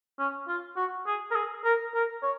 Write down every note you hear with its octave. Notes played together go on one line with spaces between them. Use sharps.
C#4
F4
F#4
G#4
A#4
G#4
A#4
A#4
C#5